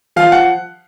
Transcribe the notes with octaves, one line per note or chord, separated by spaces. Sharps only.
F3 F5
F#5